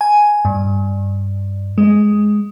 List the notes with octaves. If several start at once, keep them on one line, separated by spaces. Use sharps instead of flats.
G#5
G2
G#3